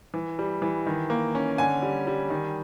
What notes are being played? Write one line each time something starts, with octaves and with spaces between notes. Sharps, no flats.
E3
G3
E3
D#3
A#3
C#4
D3 G#5
G3
G3
D#3